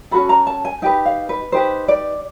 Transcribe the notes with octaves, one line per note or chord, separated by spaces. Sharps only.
C#4 F#4 A4 B5
A#5
A5
G#5
D#4 G4 B4 G5
F5
B4
D#4 G4 B4 C5
D5